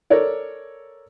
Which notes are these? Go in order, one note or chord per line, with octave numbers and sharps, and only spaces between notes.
A4 A#4 C#5 D5